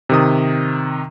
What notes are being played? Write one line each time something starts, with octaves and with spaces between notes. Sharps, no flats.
C3 D#3 D#6